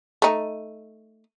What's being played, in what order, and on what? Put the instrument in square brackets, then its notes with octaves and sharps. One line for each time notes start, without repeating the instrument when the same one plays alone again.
[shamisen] A3 D#4